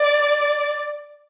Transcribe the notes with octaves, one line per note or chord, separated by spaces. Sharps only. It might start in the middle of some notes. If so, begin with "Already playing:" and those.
Already playing: D5